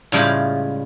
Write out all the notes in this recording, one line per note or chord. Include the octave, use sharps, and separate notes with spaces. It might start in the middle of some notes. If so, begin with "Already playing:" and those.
A2 C#3 G3 G#3 E4 F4